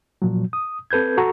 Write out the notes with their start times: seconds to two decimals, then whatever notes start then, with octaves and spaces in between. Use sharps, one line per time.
0.22 A#2 F3 F#3
0.53 D#6
0.91 C4 A4 B4 G6 G#6
1.17 F#4 A4 F#5 A#5 C#6